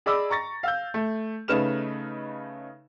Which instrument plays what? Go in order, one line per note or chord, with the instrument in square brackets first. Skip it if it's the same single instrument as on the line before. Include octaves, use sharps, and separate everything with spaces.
[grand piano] G#4 D5 D#5 B5 D6 E6
A#5 C#6 A6 A#6
F5 E6 G6
A3
C#3 A3 D#4 B4 F6 E7